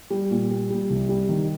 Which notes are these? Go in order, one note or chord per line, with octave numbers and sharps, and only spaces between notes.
G3
A#2
G3
G3
C2
G3
D#3